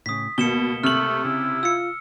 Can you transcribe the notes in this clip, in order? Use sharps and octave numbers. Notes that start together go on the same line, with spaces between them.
A2 C#3 D#6 B6
C#2 B2 A#3 C#7 E7 G7
C3 A3 F6 F#7
C#3 E4
F4 E6 C#7